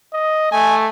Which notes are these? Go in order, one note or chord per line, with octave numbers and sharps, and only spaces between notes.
D#5
A3 G#5